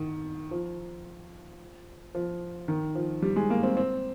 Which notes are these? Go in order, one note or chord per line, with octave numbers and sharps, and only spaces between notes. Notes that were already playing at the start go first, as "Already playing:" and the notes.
Already playing: D#3
F3
F3
D#3
F3
G3
G#3
A#3
C4
C4